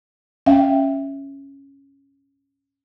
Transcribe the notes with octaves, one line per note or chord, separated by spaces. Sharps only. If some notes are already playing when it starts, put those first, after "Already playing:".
C#4 E5 F5 G5